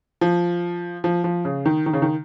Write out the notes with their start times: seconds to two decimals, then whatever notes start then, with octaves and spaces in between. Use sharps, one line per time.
0.21 F3
1.04 F3
1.24 F3
1.45 C#3
1.66 D#3
1.86 D#3
1.93 C#3
2.02 D#3